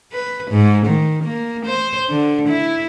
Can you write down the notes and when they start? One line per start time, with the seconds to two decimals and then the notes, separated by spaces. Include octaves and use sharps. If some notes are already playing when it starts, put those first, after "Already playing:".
0.13 B4
0.51 G#2
0.86 D#3
1.23 A#3
1.66 C5
2.09 D3
2.48 E4